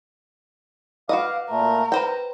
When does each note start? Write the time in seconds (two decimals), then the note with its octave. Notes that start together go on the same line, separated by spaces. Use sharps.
1.09 F#4 B4 D#5 F5 D6
1.50 A#2 A3 A#4
1.92 B4 C5 G5 A#5